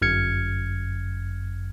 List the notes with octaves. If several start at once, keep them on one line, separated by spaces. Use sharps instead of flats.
G1 F#2 F6 G#6 C#7